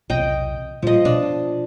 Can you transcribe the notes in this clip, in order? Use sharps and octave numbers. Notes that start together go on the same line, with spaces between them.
B1 E2 C3 D#5 G5
A#2 F3 G3 D#5
B2 D4